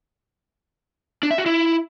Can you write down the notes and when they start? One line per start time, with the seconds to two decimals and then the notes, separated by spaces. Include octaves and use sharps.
1.23 D4
1.31 E5
1.38 F#4
1.46 E4